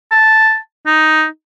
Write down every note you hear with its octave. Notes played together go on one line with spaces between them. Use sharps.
A5
D#4